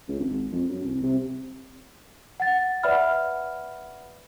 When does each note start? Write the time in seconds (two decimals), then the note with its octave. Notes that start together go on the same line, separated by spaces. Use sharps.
0.08 C#2
0.20 G#1
0.52 F2
0.69 F#2
0.83 C2
1.03 C3
2.40 F#5 A6
2.83 B4 D5 E5 F#5 B5 F6